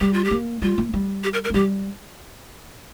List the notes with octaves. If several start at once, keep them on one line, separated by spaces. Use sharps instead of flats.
G3 G4
F4
G4
A#3
G3 F4
A#3
G3
G4
A#4
A#4
A#3
G3 G4